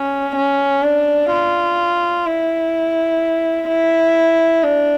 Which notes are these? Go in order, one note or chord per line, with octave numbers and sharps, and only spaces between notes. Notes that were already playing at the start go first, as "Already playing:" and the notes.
Already playing: C#4
C#4
D4
F4
E4
E4
D4